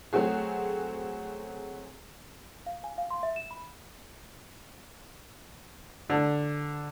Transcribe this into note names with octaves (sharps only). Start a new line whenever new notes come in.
F#3 A3 C4 F#4 G#4
F5
G#5
F5
C6
E5
E7
B5
D3